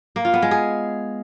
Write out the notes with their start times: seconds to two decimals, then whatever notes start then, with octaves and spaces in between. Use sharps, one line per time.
0.16 A#3
0.25 F4
0.34 B3
0.42 G#3
0.51 G#4